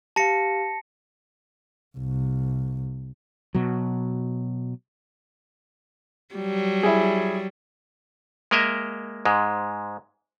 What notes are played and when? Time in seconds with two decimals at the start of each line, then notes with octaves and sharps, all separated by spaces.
0.16 G4 F5 A5 A#6 C#7
1.98 C2
3.55 B2 F#3
6.35 F#3 G3
6.83 E4 G#4
8.51 G#3 A#3 A#4 D#5 E5
9.25 G#2 G#3